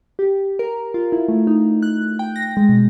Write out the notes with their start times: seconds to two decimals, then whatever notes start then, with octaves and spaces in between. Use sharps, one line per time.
0.19 G4
0.59 A#4
0.94 F4
1.12 E4
1.28 A3
1.47 D#4
1.83 F#6
2.19 G5
2.36 A#6
2.57 G#3
2.69 B2